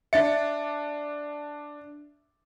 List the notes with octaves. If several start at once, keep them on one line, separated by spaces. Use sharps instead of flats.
D4 E5 A6 C#7